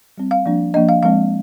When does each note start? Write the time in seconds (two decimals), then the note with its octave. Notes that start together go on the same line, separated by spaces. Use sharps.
0.17 G3 C4
0.31 F5
0.45 F3 A#3 D4
0.74 F3 A#3 D4 D#5
0.89 F5
1.03 F3 G#3 C4 F5